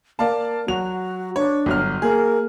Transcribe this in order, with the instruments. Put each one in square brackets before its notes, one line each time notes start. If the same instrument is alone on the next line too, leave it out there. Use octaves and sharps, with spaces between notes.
[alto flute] A#3 [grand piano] D5 F5 A5
[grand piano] F#3 F7 [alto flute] F#4
[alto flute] D4 [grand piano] C#5
[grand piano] G1 F#3 F6
[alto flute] A#3 [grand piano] G#4